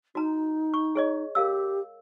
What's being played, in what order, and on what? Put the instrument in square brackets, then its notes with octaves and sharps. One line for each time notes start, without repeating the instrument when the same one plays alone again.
[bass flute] D#4 [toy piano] F#4 A#5
[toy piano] C#6
G#4 C#5 D#5
[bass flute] G4 [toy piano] A#4 F5 E6